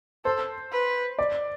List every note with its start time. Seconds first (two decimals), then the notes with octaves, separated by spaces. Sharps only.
0.25 A4 C5
0.72 B4
1.19 D5